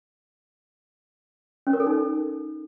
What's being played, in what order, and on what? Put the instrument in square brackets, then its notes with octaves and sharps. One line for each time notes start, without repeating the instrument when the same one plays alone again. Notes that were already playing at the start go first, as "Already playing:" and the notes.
[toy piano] C#4
A#4
A4
D#4